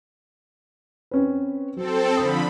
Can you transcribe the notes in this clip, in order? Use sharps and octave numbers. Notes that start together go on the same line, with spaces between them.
C4 C#4 B4
F#3 C4 A4
D3 F3 B5 D#6